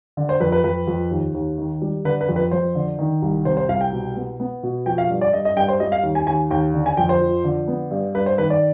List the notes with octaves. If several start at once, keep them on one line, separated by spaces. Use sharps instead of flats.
D3
C5
F2 B4
B4
F2 B4
F2
D#2
D#2
D#3
G3
D3 B4
B4
F2
B4
F2 C5
D3
D#3
C2
C3 C5
C5
C2 F5
G5
B2
B3
B3
B2
F3 G5
F5
G2
D5
G2 D#5
D#5
G2 G5
C5
G3 D#5
F5
D#2
G#5
D#2 G#5
D#2 G5
D3
G#5
F2 G5
C5
F3
D3
B3
G2
G2 B4
C5
D#3 B4
D5